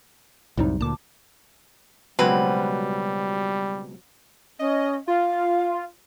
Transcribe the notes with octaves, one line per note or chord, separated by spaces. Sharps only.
C2 F#2 A2 C3 G3 D#4
D2 A#2 A5 D6
C#2 B2 F#3 G3 C4 F#4 B4
C#4 D#5
F4 F5